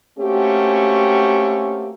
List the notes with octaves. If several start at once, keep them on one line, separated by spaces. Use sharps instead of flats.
A3 A#3 C4 C#4 F#4 G4